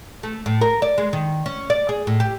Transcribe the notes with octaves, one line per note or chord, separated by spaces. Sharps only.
A3
A2
A#4
D5
G#3
D#3
C#4
D5
G#4
A2
G4